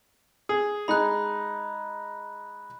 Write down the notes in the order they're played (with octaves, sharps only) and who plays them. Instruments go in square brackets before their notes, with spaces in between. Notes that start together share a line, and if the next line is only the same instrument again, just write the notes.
[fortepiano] G#4
[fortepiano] G#3 D#4 [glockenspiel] B5 F#6